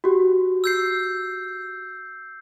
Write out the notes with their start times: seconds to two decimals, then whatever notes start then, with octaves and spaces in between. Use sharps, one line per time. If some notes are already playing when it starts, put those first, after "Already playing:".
0.04 F#4 G4
0.64 E6 G6 C7